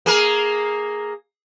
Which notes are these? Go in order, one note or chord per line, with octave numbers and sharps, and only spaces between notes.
A#3 G#4 A#4